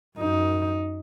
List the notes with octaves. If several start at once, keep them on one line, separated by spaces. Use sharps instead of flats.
F#2 D#4